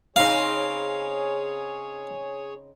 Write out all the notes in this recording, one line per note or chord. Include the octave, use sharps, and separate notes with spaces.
C#3 C4 D#4 G#4 C#5 F5